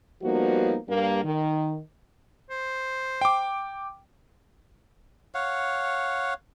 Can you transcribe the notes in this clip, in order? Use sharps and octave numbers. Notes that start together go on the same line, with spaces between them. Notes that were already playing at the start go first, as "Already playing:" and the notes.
F3 G3 A#3 B3 D#4 F#4
G2 G3 A#3
D#3
C5
G5 D6
C#5 F5 F#5